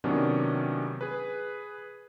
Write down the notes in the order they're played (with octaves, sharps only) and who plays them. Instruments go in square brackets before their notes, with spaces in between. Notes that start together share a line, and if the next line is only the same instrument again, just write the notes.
[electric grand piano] C3 D#3 F#3 B3 C#4 D4
G#4 B4